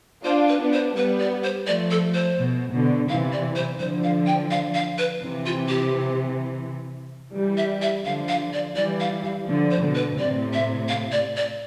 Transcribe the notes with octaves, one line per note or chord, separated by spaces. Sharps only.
D4 F4 C5
B4
B3 D4
C5
G3 B3 B4
D5
C5
F3 A3 D5
A4
C5
B2
B2 D3
C3 E3 F5
D5
C5
D3 F3 C5
F5
G5
F5
F5
B4
C3 E3
F4
G4
E3 G3
E5
E5
D3 F3 F5
F5
D5
E3 G3 D5
F5
F5
D3 F3
C5
B2 D3
B4
A2 C3 D5
E5
F5
D5
D5